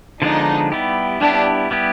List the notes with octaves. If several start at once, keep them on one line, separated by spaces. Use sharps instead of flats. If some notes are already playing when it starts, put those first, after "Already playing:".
D3 F3 G#3 B3 D4 D#4
G3 B3 E4 G4
G3 B3 D4 E4 G4
G3 B3 E4 G4